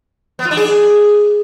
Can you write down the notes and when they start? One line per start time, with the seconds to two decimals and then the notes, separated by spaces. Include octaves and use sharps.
0.39 B3
0.45 F4
0.51 D4
0.57 G#4